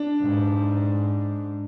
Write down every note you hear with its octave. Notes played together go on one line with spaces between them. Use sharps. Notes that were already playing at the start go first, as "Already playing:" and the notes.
Already playing: D4
G#2